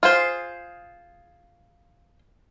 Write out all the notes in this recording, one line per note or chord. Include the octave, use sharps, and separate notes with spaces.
F4 G#4 C5